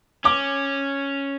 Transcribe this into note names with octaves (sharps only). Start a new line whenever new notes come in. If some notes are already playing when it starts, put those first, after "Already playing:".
C#4 D6